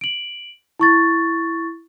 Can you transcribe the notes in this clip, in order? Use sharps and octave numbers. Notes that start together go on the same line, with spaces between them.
D7 F#7
E4 C#6 A6